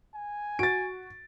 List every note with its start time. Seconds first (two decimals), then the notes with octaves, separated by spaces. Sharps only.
0.15 G#5
0.59 F#4 A6 D7